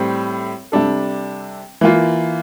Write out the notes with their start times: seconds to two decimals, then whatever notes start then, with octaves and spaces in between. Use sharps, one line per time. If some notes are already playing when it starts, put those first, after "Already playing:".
Already playing: A2 G3 C4
0.72 C3 G3 D4 A4
1.81 E3 A#3 F4